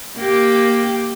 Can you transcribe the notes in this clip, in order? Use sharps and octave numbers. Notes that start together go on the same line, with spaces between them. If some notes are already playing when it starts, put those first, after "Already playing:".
A#3 G4